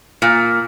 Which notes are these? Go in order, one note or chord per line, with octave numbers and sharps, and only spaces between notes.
A#2